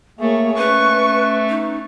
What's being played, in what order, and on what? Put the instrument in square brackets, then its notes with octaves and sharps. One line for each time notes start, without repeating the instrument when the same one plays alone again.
[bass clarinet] A3 [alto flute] A#3 [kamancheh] G#4 C#5
[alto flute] C#4 [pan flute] B4 [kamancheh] C#6
[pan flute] D#4